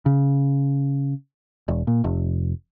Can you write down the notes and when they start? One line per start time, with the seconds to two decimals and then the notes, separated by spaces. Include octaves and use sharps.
0.06 C#3
1.68 E1
1.87 A#2
2.04 F1